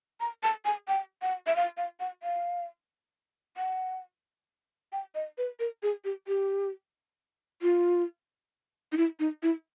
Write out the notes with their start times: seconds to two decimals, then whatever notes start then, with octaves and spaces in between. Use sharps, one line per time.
0.20 A#5
0.43 A5
0.65 G#5
0.88 G5
1.22 F#5
1.47 E5
1.56 F5
1.77 F5
2.00 F#5
2.23 F5
3.57 F#5
4.93 G5
5.15 D#5
5.38 B4
5.60 A#4
5.83 G#4
6.04 G4
6.28 G4
7.62 F4
8.92 D#4
8.97 E4
9.20 D#4
9.43 E4